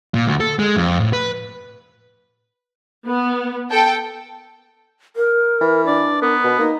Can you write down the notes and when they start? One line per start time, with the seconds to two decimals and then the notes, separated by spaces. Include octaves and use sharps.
0.14 A#2
0.26 D2
0.40 A4
0.59 G#3
0.77 F2
1.00 A2
1.13 B4
3.06 B3
3.70 A4 G5
5.16 A#4
5.61 E3
5.87 D4 D5
6.22 B3 A#4
6.44 B2
6.59 A#3 D#4